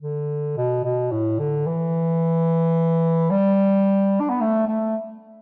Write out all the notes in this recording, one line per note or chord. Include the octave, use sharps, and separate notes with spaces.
D3
B2
B2
A2
D3
E3
G3
D4
B3
A3
A3